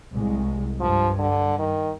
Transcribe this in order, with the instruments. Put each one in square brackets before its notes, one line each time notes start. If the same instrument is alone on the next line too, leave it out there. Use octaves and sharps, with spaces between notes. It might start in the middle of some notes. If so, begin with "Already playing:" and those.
[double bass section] C2 G#3
[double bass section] G2 [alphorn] F3
[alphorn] D3
D#3